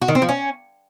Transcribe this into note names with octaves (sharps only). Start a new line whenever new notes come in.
F#4
D#3
C4
F3
C#4